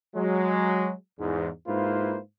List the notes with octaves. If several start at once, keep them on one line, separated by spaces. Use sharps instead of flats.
F#3 G#3
E2 G#2
G#2 A#3 E4 F4 B4 C5